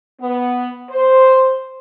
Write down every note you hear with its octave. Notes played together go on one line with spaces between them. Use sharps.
B3
C5